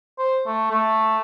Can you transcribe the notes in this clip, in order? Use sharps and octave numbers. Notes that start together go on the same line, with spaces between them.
C5
A3
A3